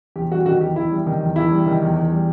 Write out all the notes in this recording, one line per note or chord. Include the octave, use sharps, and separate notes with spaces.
E2 G4
G3 F#4
D#3 F#4
E2 G4
E2 E4
G3
D#3
E2
E2 E4
G3
D#3
E2
E2
G3